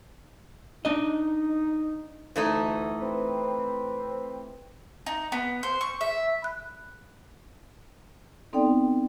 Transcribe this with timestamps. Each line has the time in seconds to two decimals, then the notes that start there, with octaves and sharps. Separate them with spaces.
0.85 D4 D#4 D#5
2.36 D2 E3 A3 D#4
3.01 C4 B4
5.06 D#4
5.32 B3
5.63 C5
5.81 C#6
6.01 E5
6.42 B5 F#6
8.53 B3 C4 D#4 A4 D5 G5